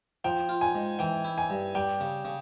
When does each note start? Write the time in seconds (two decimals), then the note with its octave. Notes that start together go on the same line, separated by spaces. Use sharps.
0.24 F3 G5
0.49 F4
0.61 G#5
0.75 G#2
0.99 E3 G5
1.25 E4
1.38 G#5
1.50 G2
1.75 G3 G5
2.00 C#3
2.25 C#3